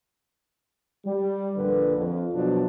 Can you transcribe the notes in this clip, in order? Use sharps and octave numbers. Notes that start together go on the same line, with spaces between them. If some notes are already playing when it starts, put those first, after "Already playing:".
G3
A#1 A#2 D3 B4
F2
B2 F3 F#3 D4